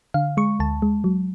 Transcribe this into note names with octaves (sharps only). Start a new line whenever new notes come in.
D3 F5
G#3 C#6
D2 A5
G#3
F#3